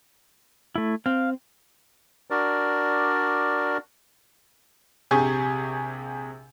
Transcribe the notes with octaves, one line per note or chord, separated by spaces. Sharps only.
A3 E4
C4 F5
D4 F#4 A#4 D5
A#1 C3 G4 G#4 G#5 C#6